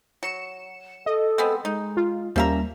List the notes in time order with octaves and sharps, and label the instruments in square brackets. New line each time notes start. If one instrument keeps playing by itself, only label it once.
[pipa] F#3 [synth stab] C#7 E7
[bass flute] A4 [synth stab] D#5
[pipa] G#3 B3 C4
[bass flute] G#3 [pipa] D#4
[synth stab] F4
[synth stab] D#2 G3 A#3 [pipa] F3 E5 A#5 [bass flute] C#4